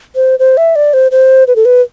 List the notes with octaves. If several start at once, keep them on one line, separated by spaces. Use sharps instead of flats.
C5
C5
E5
D5
C5
C5
B4
A4
B4